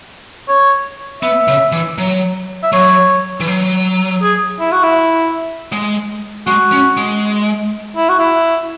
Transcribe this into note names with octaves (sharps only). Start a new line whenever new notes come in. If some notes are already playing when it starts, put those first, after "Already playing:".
C#5
B3 E5
C#3
E3
F#3
E5
F#3 C#5
E3
F#3
G#4
E4
F#4
E4
G#3
G#3 F#4
C#4
G#3
E4
F#4
E4